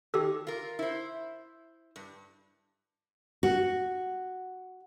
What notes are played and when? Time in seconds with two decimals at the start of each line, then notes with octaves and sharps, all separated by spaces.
0.14 D#3 G4 A4
0.47 F4 A#4
0.79 E4 C5
1.96 G2
3.43 F#4